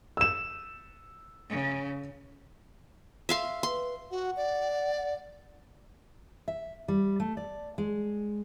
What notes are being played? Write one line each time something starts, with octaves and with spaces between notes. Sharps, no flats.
E6 E7
C#3
E5 F5 C6
B4 C6
F#4 F#5
D5
F#5
E5
G3
A3
D5
G#3